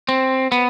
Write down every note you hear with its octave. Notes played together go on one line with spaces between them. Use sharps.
C4
B3